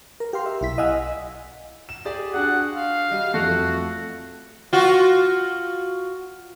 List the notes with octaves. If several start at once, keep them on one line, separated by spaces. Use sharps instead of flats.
A#4
G4 F5 C6
E5
B1 E4 B6
D#5 F5 F#5 G#5 D#6 E6
E7
G4 G#4 D5
D4 F#4 G#4 F#5
F5
G3 D#5
F2 A3 F#4 A4
F4 F#4